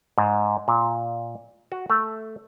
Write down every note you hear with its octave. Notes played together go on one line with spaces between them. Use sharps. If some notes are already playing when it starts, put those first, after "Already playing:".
G#2
A#2
F#4
A3